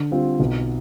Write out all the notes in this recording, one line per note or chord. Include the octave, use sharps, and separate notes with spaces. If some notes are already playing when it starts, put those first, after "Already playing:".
Already playing: D3
G3 C4 F4
B1